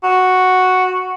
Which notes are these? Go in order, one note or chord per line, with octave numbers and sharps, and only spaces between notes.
F#4